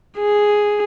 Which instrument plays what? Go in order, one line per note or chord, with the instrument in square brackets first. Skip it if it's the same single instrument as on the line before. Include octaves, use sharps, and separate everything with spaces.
[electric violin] G#4